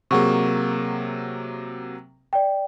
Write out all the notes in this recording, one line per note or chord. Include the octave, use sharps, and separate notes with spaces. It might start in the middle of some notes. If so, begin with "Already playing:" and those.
C3 F#3 A#3 G#4 F#5 C#6
D5 G5